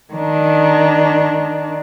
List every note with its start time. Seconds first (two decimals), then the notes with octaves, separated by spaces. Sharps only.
0.14 D#3 D4